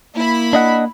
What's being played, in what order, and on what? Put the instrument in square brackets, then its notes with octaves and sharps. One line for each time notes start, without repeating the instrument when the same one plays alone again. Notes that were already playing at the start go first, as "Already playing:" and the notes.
[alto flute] A#3 [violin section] E4 B5
[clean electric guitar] D4 D#5 F#5